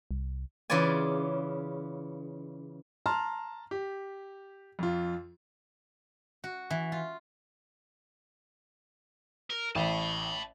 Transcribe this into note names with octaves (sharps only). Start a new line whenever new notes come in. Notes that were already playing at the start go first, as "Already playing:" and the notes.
C2
C#3 E3 F4 B4 D5 G#5
A5 A#5 C6 F6
G4
F2 F4
F#4
E3
F4
A#4
A1 A5 B5